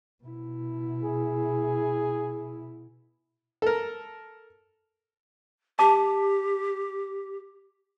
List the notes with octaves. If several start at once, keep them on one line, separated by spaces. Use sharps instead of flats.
B2 E4
G#4
A4 A#4
G4 A5 D6